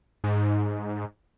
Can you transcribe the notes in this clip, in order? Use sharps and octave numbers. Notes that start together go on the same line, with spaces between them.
G#2